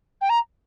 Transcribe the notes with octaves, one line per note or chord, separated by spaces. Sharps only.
G5
A#5